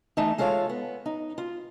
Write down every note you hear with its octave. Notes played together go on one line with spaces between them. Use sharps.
E3 A3 D#4
G#3 F4 A4 C#5 D5 F5
B3
D#4
F4